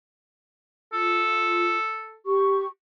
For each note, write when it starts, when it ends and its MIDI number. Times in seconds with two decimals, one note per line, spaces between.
0.93 1.75 65
0.93 2.16 69
2.26 2.66 67
2.26 2.66 85